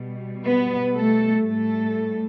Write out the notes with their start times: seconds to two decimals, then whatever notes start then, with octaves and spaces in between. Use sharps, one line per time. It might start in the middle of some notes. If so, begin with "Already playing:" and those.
Already playing: B2 G3
0.46 B3 B4
0.95 A3 A4
1.44 A2 G3 A3 A4